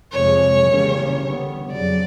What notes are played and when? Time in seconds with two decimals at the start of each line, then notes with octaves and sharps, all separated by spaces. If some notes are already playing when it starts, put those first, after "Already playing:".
0.12 F2 C3 F3 G#3 C#5
0.67 C#3 E3 G3 A#3 C#4
1.20 D3 G3 B3
1.73 F2 C#3 F#3 D5